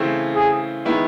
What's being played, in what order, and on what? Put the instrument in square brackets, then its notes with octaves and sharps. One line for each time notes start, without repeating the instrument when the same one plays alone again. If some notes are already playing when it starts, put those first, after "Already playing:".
Already playing: [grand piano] C#3 E3 A3 C4
[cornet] G#4
[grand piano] D#3 G#3 B3 E4